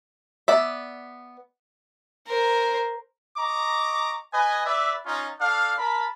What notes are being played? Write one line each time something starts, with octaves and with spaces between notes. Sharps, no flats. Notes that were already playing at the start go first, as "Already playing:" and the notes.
B3 D5 E5
A#4 C5
D#5 A#5 C#6 D6
B4 D#5 G#5
B4 D5 E5
C#4 D#4 F4
D4 A4 F5
A#4 A5 B5